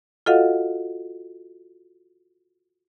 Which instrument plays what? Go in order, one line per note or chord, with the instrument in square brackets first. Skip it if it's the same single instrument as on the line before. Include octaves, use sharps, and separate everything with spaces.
[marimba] F4 F#4 A4 D#5 F5 F#5